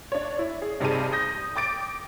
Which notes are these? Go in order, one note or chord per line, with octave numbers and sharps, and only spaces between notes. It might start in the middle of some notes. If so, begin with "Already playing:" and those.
D4 C#5
E4
G#4
G2 C3 D#4 G#4 A5 D#7
D#6 G6 A#6
G5 D6 A6 D7